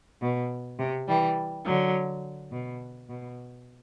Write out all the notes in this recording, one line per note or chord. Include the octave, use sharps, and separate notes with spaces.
B2
C3
E3 G3
D3 F#3
B2
B2